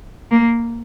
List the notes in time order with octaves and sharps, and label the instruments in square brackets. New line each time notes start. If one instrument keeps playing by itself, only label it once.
[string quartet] A#3